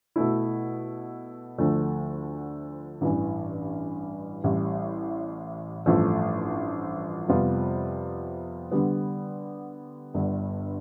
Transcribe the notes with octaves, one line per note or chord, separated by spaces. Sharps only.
B2 A3 E4
D2 D3 F3 A3
A1 G2 E3
A1 A2 G3
A1 G2 F3 A3
F2 C3 G3 B3 F4
D3 G3 B3
G1 G2 D3